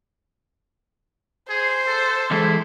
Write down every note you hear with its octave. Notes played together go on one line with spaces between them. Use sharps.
G#4 C5
A4
E3 G#3 E4 A4